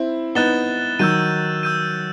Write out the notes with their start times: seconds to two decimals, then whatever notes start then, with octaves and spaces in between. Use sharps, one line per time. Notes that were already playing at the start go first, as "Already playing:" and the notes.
Already playing: C4 E4
0.35 B3 D#4 F#6 A6 E7 G7
0.99 D#3 F#3 E6 G6 D#7
1.63 E6 G6 D#7